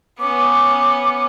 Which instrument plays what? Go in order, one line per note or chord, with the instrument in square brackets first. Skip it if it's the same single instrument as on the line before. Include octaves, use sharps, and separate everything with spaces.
[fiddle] B3 C#4 [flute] D6